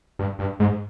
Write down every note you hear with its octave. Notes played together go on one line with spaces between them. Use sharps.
G2
G2
G#2